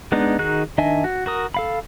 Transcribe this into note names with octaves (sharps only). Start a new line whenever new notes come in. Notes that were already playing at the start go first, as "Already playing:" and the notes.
G#3 B3 D4 D#4
D#3 D#4 F#4 G#4 F#6
D#3 D4 D#5 E5 G#5
F#4
F#4 A#4 D#6
A4 F5 B5